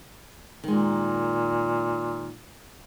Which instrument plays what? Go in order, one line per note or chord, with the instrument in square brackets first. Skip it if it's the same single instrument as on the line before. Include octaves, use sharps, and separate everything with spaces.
[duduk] A#2 [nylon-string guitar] D#3 G#3